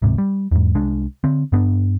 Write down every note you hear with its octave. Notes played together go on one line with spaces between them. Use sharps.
D1 G#2 C3
G3
E2 G#2
C2 G#3 D4
D3 C4
G2 B3 D4